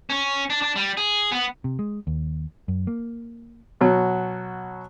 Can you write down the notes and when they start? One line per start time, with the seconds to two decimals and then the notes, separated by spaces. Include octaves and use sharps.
0.10 C#4
0.50 D4
0.62 D4
0.76 G3
0.97 G#4
1.32 B3
1.64 C3
1.79 G#3
2.07 D#2
2.68 F#2
2.87 A#3
3.81 B2 F#3